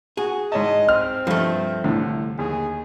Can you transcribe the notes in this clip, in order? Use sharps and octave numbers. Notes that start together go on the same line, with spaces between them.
F#4 G#4
G#2 C#5 D#5 A5
C4 F6
G2 F3 A3
C2 A2 D3
D#2 G#4